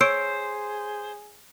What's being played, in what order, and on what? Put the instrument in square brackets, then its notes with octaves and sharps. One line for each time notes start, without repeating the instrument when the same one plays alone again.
[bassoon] G#4 [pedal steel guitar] C5 [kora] C#5 [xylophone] E6 D7